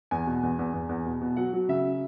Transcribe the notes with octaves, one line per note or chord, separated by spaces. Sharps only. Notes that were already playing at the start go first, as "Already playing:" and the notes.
E2 G#5
B2
E2
E2
E2
E2
B2
B2
F#3 F#5
F#3
C#3 E5